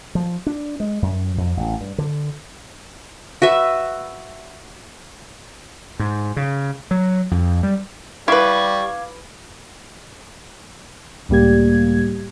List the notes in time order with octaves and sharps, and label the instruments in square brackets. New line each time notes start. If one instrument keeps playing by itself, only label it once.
[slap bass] F3
D4
G#3
F#2
F2
A1
G2
D3
[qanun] F#4 B4 E5
[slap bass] G#2
C#3
F#3
F2
G3
[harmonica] G3 [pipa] E4 B4 [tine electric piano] F5 D6 G#6 [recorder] C#6
[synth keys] C#2 A2 G3 A#3 G4 G#6